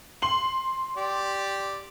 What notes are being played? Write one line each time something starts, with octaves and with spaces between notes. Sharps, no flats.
C6 F#7
G4 D5